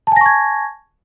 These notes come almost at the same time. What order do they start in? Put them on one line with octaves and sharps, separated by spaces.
A5 G#5 A#6 C#6 G#6